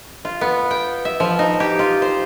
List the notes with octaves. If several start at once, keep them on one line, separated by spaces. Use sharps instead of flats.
F4
B3
G5
E5
F3
D#4
G4
F4
C5